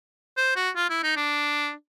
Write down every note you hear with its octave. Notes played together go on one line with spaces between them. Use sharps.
C5
F#4
F4
E4
D#4
D4